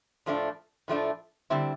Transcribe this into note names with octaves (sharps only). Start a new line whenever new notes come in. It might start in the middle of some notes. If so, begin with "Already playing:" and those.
A2 F3 A3 D4
A2 F3 A3 D4
D3 G3 C4 E4